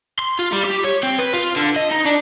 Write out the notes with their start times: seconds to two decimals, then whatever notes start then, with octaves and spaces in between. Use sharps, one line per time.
0.19 C6
0.39 F4
0.53 G3
0.65 G4
0.84 C#5
1.03 C4
1.19 B4
1.33 F4
1.57 D3
1.76 D#5
1.91 D#4
2.05 D4